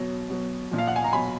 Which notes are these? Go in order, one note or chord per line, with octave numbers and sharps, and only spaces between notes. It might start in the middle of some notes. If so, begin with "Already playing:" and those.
Already playing: B2 F#3
B2 F#3
A#2 F3
F5
F#5
G#5
A#5
B2 F#3 G#5 B5